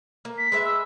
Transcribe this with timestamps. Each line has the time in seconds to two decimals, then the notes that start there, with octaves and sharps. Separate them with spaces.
0.25 A#3
0.38 B6
0.52 G#3 B4 E5
0.65 E6